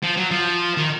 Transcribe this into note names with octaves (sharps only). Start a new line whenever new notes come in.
F3
F#3
F3
D#3